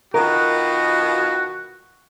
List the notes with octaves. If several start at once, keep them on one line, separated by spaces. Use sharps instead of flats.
B2 D#3 F4 F#4 A#4